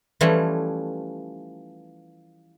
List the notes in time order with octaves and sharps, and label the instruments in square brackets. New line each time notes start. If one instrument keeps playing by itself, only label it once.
[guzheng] E3 F3 G3 A3 C#4